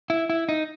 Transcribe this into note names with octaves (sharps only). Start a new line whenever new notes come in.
E4
E4
D#4